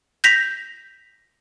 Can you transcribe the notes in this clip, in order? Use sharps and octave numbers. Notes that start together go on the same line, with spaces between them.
G6 A#6 B6 F7